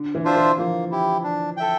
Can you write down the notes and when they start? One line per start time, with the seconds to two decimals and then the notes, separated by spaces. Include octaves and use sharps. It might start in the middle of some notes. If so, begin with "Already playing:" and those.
Already playing: D3
0.15 E3
0.25 D4 F4 C5 E5
0.36 E3
0.58 F3 A#3
0.91 E4 G4
1.23 D4
1.57 A4 E5 G5